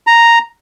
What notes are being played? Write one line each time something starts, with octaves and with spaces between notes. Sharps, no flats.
A#5